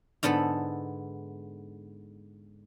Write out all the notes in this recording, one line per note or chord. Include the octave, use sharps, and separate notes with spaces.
G#2 D3 B3 A4 B5